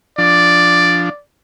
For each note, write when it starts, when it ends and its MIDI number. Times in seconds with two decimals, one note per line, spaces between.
0.18 1.09 53
0.18 1.09 62
0.18 1.21 74